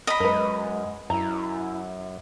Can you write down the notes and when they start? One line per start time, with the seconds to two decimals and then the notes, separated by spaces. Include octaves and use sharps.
0.07 D#5 B5
0.20 F#2 G#3 A#4 B4
1.10 F#2 E4 A#5